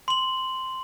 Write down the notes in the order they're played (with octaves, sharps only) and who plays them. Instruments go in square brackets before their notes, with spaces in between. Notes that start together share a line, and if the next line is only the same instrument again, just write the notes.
[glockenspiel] C6 F#7